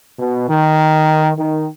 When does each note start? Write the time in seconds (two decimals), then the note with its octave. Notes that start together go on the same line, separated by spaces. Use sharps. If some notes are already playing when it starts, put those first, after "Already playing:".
0.19 B2
0.49 D#3
1.36 D#3